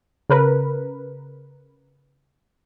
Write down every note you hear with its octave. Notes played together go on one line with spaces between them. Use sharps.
C#3 A#4 B4